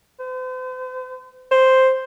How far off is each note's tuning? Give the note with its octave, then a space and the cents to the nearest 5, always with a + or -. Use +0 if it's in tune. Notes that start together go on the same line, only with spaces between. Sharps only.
C5 -40
C5 +0